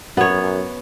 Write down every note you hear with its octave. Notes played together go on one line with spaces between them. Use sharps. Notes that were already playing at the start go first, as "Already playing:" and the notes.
F#2 B3 C#5